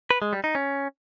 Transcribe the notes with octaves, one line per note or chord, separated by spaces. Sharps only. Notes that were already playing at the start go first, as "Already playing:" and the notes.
B4
G#3
G3
D#4
C#4